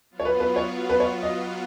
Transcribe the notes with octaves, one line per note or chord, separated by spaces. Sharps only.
F#3 B3 F4
C#5
B4
B4
C#5
B4
C#5
D#5